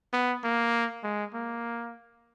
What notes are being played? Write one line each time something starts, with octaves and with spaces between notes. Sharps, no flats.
B3
A#3
G#3
A#3